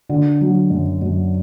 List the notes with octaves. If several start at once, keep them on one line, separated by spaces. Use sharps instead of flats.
D3
F#3
F#2
F#2